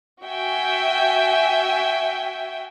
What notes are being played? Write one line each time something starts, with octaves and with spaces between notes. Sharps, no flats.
F#4 E5 G5 G#5